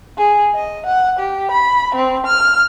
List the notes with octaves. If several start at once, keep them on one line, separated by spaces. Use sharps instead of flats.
G#4
D#5
F#5
G4
B5
C4
F6